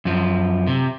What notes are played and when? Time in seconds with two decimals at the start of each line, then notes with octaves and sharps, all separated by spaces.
0.05 F#2 F3
0.67 C3